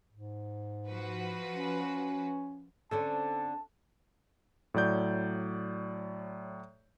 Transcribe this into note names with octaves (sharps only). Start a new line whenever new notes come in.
G#2
F3 F#4 B4
C#4
D3 C4 C#4 A4 A5
A2 F#3 D5 G6